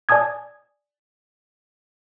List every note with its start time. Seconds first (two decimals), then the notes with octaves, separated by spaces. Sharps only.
0.09 D5 G#5 A5 D#6 G#6